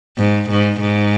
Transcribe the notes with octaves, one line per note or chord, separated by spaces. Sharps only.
G#2
G#2
G#2